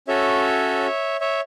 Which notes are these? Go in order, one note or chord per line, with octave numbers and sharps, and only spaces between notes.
C#4 F#4 A4 C#5 E5
C#5 E5